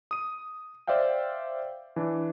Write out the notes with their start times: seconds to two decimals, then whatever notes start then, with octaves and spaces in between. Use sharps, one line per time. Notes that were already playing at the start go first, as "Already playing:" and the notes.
0.11 D#6 D#7
0.87 C5 D5 E5 F5 G5
1.96 E3 D4